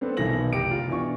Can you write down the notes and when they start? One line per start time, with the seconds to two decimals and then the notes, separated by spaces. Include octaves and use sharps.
0.01 B3 C4 D4 A4 B4
0.17 B1 B2 D#3 E3 A#6 F#7
0.52 F1 G4 D7
0.69 F#1 F4
0.88 B2 E3 D4 C#6